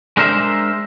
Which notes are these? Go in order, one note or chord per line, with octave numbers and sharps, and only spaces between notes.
G#3 D4 A#4 C5 E5